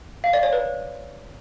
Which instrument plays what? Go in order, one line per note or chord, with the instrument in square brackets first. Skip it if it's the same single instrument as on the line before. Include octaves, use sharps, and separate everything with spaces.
[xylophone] F5
D5
C#5
B4